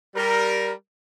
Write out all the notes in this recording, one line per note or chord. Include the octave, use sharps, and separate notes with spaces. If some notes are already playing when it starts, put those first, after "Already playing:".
G3 A#4